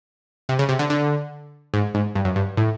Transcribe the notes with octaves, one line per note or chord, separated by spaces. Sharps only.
C3
C#3
C3
D3
D3
G#2
G#2
G2
F#2
G2
A2